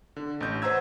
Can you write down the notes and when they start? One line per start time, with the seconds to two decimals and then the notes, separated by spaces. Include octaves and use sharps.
0.16 D3
0.41 A1 G6
0.62 B4 C5 F#5 A#5 E6 G#6